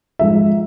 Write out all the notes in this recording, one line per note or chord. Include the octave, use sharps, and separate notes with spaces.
G#2 F3 G#3 E5